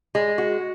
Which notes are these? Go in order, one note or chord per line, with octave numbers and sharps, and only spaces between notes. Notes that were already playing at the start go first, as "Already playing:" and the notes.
G#3
F#4